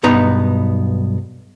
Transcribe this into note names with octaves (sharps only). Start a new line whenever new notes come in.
B1 G2 B3 D#4 A#5